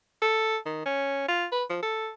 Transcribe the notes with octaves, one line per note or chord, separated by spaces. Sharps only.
A4
D#3
C#4
F4
B4
F3
A4